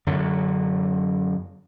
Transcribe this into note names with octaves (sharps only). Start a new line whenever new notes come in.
F#2 D3 F#3